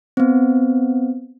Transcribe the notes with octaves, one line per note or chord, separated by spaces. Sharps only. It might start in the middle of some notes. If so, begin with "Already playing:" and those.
B3 C4